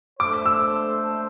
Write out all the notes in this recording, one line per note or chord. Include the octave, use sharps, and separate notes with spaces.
A3 D4 A4 C5 D6
E6